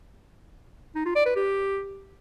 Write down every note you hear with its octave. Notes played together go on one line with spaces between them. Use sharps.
D#4
F4
D5
B4
G4